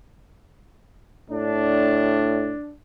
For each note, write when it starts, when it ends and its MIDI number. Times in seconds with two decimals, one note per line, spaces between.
1.30 2.54 45
1.30 2.72 62